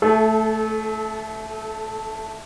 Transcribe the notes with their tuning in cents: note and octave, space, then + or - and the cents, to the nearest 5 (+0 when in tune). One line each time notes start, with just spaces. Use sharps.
A3 +0 A4 -30